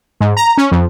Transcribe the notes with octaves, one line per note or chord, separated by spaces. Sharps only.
G#2
A#5
C#4
F2